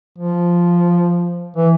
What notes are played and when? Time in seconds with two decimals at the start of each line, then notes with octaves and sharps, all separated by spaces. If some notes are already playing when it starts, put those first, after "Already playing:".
0.18 F3
1.56 E3